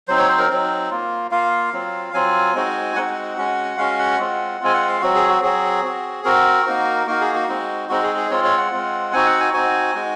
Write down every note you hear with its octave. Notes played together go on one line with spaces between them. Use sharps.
F#3 C4 D#4 C5
C#5
C5
A#4
F#3 C4 D#4
A#3 F4
A#3 F4 F5
F#3 C4 F4
F#3 C4 F4 G#5
G#3 C4 D#4 F#4
G#3 C4 D#4 F#4 F#5
G#3 C#4 F#4
G#3 C#4 F#4 F5
F#5
G#3 C4 F4
G#3 C4 F4 G#5
F#5
F5
F#3 C4 F#4
G#4
F#4
F#3 C4 F#4 G#4
C4 F#4
C4 F#4 A#4
A#3 D#4 F#4
A#3 D#4 F#4 A#4
G#4
F#4
G#3 C4 D#4
G#3 C4 D#4 F#4
G#4
G#4
G#3 C4 F4 C#5
C#5
F#5
G#3 C4 F4
C4 D#4 F#4 G#5
F#5
G#5
C4 D#4 F#4 G#5
G#3 D#4 F#4